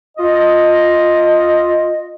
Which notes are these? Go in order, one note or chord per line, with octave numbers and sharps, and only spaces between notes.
F4 D#5